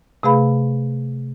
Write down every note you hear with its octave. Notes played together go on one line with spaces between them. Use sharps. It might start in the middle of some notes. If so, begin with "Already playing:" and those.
C3 A3 G#4 B4 F5 B5